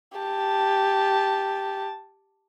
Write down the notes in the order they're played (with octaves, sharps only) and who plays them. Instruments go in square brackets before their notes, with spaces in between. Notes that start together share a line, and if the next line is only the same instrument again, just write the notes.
[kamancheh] G4 A5